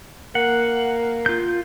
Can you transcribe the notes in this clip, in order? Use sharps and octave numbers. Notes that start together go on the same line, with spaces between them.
A#3 F#5
F4 G6